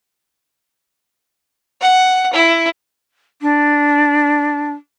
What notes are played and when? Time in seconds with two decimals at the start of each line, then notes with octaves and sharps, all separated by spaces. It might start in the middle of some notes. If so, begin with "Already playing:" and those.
1.81 F#5
2.33 E4
3.42 D4